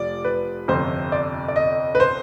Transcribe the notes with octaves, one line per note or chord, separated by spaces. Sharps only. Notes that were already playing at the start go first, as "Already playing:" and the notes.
Already playing: F1 F3 D5
B4
G1 F2 C3 C5
D5
D5
D#5
B4
C5